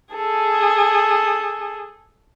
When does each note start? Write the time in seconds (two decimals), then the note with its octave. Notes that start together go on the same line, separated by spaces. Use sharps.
0.15 G#4 A4